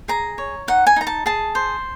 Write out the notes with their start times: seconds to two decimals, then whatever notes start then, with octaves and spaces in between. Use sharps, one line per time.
0.08 G#4 A#5
0.38 C#5
0.68 D#4 F#5
0.87 G#5
0.96 D#4 A#5
1.07 A5
1.26 G#4 A5
1.55 C5